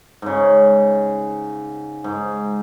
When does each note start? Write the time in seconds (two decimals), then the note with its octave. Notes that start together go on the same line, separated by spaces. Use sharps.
0.22 G#2 C#3
2.04 G#2